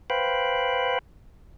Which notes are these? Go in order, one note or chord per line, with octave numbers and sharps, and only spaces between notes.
B4 C5 F5 G5 B5